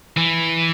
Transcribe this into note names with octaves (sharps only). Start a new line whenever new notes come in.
E3